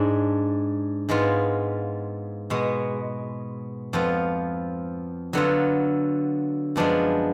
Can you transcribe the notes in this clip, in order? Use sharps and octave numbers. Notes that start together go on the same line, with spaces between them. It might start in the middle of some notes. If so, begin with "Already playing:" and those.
Already playing: G#2 G#3 D4
G#2 G#3 B3 F4
B2 G#3 B3
F2 F3 B3 F4
D3 F#3 B3 F4
F#2 F3 G#3 B3 D4